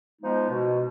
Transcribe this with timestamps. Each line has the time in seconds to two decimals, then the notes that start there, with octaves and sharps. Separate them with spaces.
0.22 F3 G#3 B3 D#4
0.50 B2